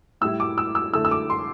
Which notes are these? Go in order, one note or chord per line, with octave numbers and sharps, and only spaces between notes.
A2 G3 E4 E6
D6
E6
E6
D3 A3 E4 E6
E6
D6
C6